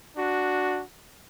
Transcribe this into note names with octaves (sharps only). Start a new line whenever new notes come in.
D4 F#4